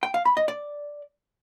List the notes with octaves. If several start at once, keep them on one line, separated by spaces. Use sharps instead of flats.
G5
F5
B5
D#5
D5